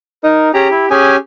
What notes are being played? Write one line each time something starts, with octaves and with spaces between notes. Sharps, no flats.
D#4 A#4
C#4 G4 G#4 A#5
E4
C#4 G4 G#4 G#5